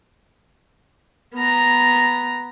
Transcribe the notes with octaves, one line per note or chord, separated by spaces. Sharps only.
B3 A#5